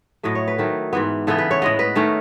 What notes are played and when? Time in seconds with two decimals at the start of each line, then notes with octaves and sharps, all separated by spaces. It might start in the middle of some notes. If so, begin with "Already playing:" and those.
0.23 A2 F#3 A3 D#5
0.35 C#5
0.48 B4
0.58 D#3 F#3 A3
0.93 G#2 E3 B3
1.27 C#3 E3 B3 A4
1.38 B4
1.51 C#5
1.62 A2 G#3 B3 D#5
1.79 B4
1.95 D#3 A3 C#4